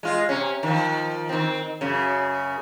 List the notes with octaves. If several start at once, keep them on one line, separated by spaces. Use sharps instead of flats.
G#3 F4
C3 C#4
D#3 F3
D#3 C4
F#2 C#3